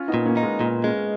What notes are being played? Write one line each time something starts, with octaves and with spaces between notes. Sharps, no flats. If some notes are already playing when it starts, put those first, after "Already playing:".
Already playing: C#4 F4
B3 D#4
A#2
A#3 C#4
D#4
G#3 B3
A#2 G#3 B3
G#3 A#3 C#4